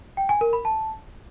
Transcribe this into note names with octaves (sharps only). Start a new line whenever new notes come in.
G5
G#5
A#4
B5
A5